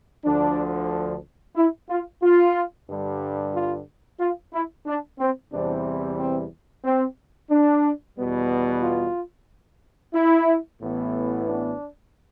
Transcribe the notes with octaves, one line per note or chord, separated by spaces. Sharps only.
D2 D3 F3 D4
E4
F4
F4
G2 D3 G3
F4
F4
E4
D4
C4
E2 C3 E3 G3 C4 D4
C4
C4
D4
E2 B2 G3 B3
F4
E4
A1 A2 E3 B3
D4